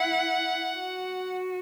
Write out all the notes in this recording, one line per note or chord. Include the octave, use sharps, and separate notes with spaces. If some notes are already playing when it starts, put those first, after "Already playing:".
Already playing: E4 F#5
F#4